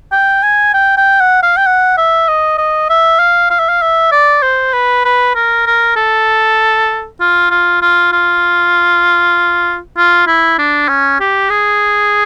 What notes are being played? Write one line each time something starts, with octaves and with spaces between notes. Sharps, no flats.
G5
G#5
G5
G5
F#5
F5
G5
F#5
E5
D#5
D#5
E5
F5
F5
E5
F5
E5
D5
C5
B4
B4
A#4
A#4
A4
F4
F4
F4
F4
F4
E4
D4
C#4
G4
G#4